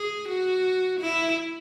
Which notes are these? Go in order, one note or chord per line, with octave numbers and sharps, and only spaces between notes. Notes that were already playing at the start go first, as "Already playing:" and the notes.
Already playing: G#4
F#4
E4